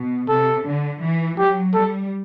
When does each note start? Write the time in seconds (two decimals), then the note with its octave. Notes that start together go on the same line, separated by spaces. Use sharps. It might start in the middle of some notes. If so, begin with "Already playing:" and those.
Already playing: B2
0.29 C3 A4
0.65 D3
1.01 E3
1.37 F#3 G4
1.74 G3 A4